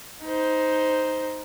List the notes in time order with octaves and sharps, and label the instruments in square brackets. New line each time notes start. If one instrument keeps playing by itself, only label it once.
[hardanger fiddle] D#4 C5